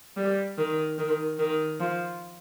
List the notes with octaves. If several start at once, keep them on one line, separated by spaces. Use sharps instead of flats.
G3
D#3
D#3
D#3
F3